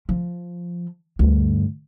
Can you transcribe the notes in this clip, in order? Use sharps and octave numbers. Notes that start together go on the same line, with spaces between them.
F3
D2 G2